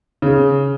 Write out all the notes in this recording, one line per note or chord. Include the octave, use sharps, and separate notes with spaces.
C#3